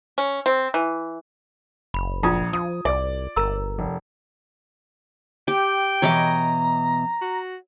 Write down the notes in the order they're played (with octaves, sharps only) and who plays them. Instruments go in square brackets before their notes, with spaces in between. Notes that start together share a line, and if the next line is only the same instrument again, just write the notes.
[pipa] C#4
C4
E3
[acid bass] F#1 [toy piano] B5
[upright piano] A#1 D#6 G#6 [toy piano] F4 A#5
[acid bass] F3 [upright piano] D#6
[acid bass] C2 [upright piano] D5
[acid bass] G1 [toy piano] A#4 A#5 E6
[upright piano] F1
[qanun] G4 [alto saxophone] G5
[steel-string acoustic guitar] B2 E3 D#5 [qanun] C#5 B5 D6 [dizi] A#5
[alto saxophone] F#4